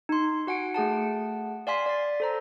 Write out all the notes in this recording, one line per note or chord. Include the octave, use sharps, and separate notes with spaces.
D#4 C6
F#4 F#5 G#5 D7
A3 G#4 F#5 A5
D5 F5 G#5 C6 B6
D5 A6
A4 C5 A#5